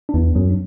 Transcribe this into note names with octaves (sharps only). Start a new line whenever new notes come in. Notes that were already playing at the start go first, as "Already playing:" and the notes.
D4
E2 B3
F#2 F#3
D4